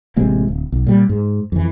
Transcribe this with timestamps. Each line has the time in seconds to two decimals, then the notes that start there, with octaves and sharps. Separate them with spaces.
0.16 A1 C3 G#3 A#3
0.48 D1
0.72 B1
0.87 A#2 G3
1.09 G#2
1.52 F2 E3